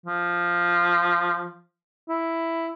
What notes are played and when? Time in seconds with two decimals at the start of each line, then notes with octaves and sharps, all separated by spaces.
0.06 F3
2.09 E4